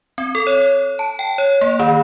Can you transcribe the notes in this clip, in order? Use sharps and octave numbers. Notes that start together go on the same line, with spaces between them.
C4
A4
C#5
A5
G5
C#5
A#3
D#3